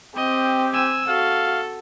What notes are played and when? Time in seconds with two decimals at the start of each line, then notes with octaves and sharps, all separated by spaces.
0.16 C4 G4 D#5
0.73 G#5 E6
1.08 F#4 A4 F5